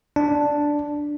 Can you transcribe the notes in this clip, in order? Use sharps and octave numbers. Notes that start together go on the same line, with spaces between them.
D4